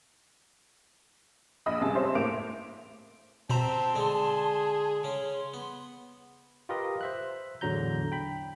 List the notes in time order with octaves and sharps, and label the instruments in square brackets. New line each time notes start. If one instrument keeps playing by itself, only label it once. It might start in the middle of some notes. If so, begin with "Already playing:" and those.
[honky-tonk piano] A#1 D#5 B5 D#6
C#2 G2 C3 G#4 A5
C4 G4 C5 C#5 E5
A2 A#3 D6 D7 F7
[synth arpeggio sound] B2 A#5 [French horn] C4 [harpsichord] G4 C5 E5 [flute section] A5 C6
[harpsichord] D3 G#3 C4 [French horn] G#4
[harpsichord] C#3 C#4 [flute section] C6
[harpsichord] B3
[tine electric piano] F4 G4 A#4 B4 D#5
C5 E5 F#6
E2 A2 D3 F#3 A#5 G6
G5 B5